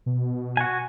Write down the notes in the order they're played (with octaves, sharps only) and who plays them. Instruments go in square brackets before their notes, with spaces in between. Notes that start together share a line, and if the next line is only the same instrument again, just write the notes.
[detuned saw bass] B2
[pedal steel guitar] F#4 G#5